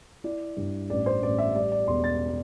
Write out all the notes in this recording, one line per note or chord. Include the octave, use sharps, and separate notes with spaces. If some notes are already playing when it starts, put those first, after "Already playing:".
E4 D5
G2
A1 D5
C5
A1 D5
E5
G3 D5
D5
E1 C6
A6